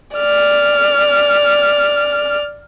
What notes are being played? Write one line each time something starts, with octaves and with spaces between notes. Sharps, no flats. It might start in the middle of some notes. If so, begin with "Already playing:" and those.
D5 F6